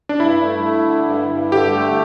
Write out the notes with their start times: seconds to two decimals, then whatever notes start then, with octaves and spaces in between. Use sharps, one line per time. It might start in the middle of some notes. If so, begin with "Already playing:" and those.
0.09 D4
0.20 G2 E4
0.42 A3
0.64 A3
0.86 D3
1.08 G2
1.30 G2
1.52 D3 G4
1.74 A3